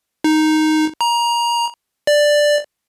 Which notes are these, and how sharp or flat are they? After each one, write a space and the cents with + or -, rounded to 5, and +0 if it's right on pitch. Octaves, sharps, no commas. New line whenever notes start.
D#4 +0
A#5 +20
D5 +5